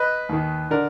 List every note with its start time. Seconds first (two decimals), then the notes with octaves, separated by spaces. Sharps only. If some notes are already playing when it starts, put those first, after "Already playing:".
Already playing: B4 D#5
0.29 D#2 D#3
0.70 D3 A#4 D5